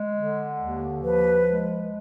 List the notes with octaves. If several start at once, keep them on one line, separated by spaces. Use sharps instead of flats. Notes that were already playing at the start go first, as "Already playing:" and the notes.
Already playing: G#3
D3
D#2
F3 B4
G#3